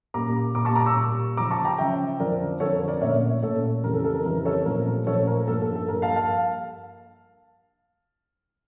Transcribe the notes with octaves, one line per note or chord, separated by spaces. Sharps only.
A#2 G3 A#3 C#4 A#5 D6
A#2 G3 A#3 A#5 D6
A5 C#6
A#5 D6
C#6 E6
A#2 G3 A#3
C#3 F3 C#4 A#5 D6
A5 C#6
G5 A#5
C#3 F3 C#4 E5 G5
F2 D3 F3 A#4 D5
F2 D3 F3 A4 C#5
A#4
A#4 D5
A#2 A3 C#4 C#5 E5
A#2 A3 C#4 A4 C#5
F2 C#3 E3 G3 A#4
A4
A4
A#4
F2 C#3 E3 G3 A#4
A4 C#5
A#2 F3 A3 C#4 A#4
A#2 F3 A3 C#4 A4 C#5
A#4
G2 F3 A#3 A4
A4
A4
G2 F3 A#3 A#4
F5 A5
F5 A5